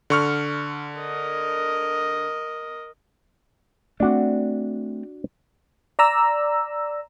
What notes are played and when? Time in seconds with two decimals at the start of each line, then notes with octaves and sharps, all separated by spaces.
0.10 D3 C#6 F6
0.99 A#4 D#5
4.00 A3 B3 C4 D4 F#4
5.99 D5 A#5 E6